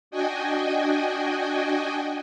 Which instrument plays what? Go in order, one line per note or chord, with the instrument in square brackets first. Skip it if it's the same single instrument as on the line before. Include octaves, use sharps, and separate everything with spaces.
[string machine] D4 F#4 D#5 G5 G#5